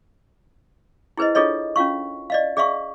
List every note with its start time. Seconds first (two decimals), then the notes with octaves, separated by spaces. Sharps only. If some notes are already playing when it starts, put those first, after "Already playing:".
1.17 E4 G#4 B4 C5 D#5
1.35 D4 F4 G#4 A4 C#5 D#5
1.76 C#4 F4 F5 C#6
2.30 D5 D#5 F5
2.57 G#4 D5 E5 F5 C#6